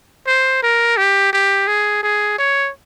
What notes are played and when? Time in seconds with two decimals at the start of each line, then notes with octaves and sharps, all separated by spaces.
0.27 C5
0.63 A#4
0.97 G4
1.33 G4
1.67 G#4
2.03 G#4
2.38 C#5